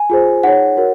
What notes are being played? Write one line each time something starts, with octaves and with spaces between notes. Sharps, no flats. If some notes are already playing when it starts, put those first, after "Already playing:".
Already playing: G#5
F4 G#4 C5
D#4 G#4 C#5 F#5
F#4 A#4 C#5